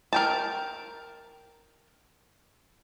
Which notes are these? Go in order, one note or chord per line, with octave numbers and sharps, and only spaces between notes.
A#4 G5 A5